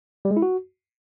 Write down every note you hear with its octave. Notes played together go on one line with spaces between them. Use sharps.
G3
G#3
E4
F#4